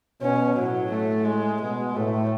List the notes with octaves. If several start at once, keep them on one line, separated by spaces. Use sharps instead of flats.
B2 C#4
A2 F#3
A3
G#3
B2 G#3
A2 A3